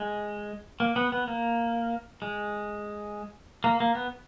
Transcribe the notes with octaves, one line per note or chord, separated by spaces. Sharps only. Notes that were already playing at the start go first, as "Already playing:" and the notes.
Already playing: G#3
A#3
B3
B3
A#3
G#3
A#3
A#3
B3